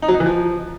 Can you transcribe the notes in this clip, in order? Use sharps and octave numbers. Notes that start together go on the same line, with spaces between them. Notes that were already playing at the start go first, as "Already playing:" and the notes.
D#4
F#3
D#4
E3
F3